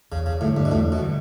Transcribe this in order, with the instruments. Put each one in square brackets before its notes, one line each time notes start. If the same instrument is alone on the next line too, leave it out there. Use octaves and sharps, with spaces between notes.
[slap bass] E2 [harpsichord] C#3
[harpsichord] C#3
[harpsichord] A2 [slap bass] D3 G3
[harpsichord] G2
B2
[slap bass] E2 [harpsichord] A2
[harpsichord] B2
[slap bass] D3 G3